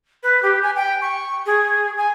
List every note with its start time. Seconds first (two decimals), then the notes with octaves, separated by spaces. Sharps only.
0.23 B4
0.42 G4
0.63 G#5
0.76 G5
1.02 C#6
1.46 G#4
1.98 G#5